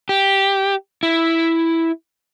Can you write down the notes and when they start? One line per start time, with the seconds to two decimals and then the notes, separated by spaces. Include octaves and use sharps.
0.09 G4
1.03 E4